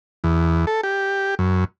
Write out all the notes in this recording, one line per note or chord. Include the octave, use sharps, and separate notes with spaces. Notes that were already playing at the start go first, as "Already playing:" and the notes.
E2
A4
G4
F#2